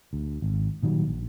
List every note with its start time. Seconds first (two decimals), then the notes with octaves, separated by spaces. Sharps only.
0.13 D2
0.42 G#1
0.83 A#2 D#3 F#3 G3
1.07 A#1